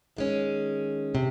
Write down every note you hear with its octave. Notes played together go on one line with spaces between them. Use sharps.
D#3 G#3 C#4
C3